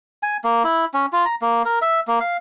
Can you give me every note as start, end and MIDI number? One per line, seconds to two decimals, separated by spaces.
0.23 0.37 80
0.44 0.63 58
0.64 0.85 64
0.94 1.06 61
1.13 1.25 65
1.25 1.35 82
1.42 1.63 58
1.65 1.79 70
1.82 2.00 76
2.08 2.19 58
2.20 2.37 77